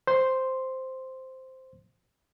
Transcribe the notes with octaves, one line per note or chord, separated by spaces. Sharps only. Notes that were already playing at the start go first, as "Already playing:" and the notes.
C5 C6